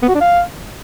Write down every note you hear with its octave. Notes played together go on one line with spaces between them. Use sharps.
B3
F#4
D4
F5